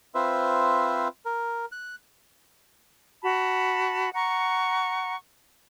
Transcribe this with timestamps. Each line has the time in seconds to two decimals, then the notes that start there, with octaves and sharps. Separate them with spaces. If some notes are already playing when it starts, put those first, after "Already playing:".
0.15 C4 F4 B4 C5 E5
1.26 A#4
1.72 F#6
3.23 F#4 A5 B5
4.14 F#5 A#5 C#6